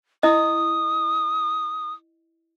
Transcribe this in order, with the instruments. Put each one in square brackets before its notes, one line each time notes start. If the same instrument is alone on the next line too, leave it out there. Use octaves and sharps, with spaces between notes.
[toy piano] E4 D#5 [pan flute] D#6